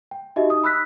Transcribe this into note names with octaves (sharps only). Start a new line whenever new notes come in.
G5
D#4 F#4 G4 D#5 E5
D#4 D#6
B5 E6 F#6 B6